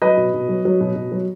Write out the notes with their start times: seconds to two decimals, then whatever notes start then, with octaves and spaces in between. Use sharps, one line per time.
0.01 F#3 B4 D#5
0.17 B2
0.34 B2
0.49 F#3
0.65 F#3
0.81 B2
0.96 B2
1.12 F#3